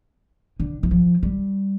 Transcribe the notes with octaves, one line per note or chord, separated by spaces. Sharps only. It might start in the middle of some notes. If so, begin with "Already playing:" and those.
D3
E3
F3
G3